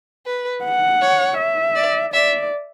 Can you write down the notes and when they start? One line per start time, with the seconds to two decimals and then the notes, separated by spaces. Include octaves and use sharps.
0.26 B4
0.64 F#5
1.02 C#5
1.38 E5
1.76 D5
2.13 D5 E5